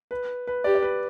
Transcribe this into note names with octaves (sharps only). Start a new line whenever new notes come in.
B4
B4
G4 D5
D5
B4